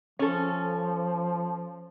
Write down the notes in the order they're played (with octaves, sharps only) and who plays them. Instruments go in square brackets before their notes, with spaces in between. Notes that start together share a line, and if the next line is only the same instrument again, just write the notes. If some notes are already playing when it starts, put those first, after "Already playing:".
[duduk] F3 [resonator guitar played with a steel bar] C#4 A4